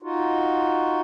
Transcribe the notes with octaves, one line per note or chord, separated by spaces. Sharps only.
D#4 F4 F#4